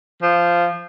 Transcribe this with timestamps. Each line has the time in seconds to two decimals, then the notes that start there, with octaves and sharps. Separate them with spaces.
0.23 F3